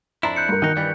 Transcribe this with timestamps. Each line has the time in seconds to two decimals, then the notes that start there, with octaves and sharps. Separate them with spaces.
0.23 F2 D4 E4 A#5 C6
0.36 F#6 G6 C#7
0.49 G2 A#4
0.62 B2 D#3 D#4 F#6
0.77 G2 E3 G3